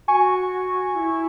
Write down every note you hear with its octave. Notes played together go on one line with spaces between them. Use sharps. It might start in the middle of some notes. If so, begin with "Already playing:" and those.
F#4 G#5 C#6
E4